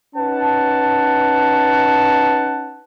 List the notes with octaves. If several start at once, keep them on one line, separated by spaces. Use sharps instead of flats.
C#4 D#4 B4 F#5 A5